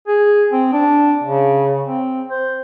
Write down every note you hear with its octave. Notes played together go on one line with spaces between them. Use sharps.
G#4
C4
D4
C#3
C4
C5